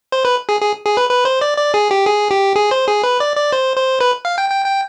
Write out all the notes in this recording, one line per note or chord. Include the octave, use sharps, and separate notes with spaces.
C5
B4
G#4
G#4
G#4
B4
B4
C5
D5
D5
G#4
G4
G#4
G4
G#4
C5
G#4
B4
D5
D5
C5
C5
B4
F5
G5
G5
G5